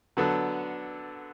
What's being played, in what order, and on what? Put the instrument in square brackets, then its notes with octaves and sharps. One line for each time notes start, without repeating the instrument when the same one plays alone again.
[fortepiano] D3 F#3 B3 D4 A4